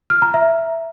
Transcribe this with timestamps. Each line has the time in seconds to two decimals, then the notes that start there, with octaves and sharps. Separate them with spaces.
0.10 F6
0.22 A#5
0.34 E5